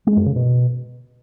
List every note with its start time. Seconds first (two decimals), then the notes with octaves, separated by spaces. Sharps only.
0.07 G#3
0.16 F#2
0.26 C#3
0.36 B2